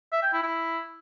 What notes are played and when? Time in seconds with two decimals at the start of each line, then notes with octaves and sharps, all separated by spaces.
0.13 E5
0.23 G5
0.33 E4
0.43 E4